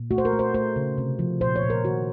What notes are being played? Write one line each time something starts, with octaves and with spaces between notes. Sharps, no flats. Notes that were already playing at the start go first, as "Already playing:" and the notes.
Already playing: A#2
A3 F#4
C5
A#4
A3
C5
A3 C5
C#3
C3
F3
A#2 C5
C#5
A#2
A#4
D#3 F#4